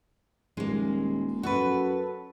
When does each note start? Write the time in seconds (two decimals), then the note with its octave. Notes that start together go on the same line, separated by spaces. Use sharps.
0.57 D#1 G#3 A#3
1.43 F#2 F#4 A4 B4